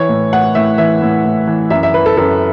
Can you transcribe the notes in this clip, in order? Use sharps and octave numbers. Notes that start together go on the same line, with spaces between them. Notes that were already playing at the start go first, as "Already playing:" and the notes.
Already playing: E3 C#5
A2
A2 F#5
A2 E5
E3 E5
A2
A2
E3
F#2 E5
E5
E3 B4
A4
F#2 A4